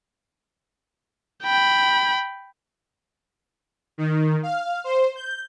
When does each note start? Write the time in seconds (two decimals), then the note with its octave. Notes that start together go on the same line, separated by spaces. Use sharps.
1.44 G5 B5
3.98 D#3
4.43 F5
4.84 C5
5.16 G6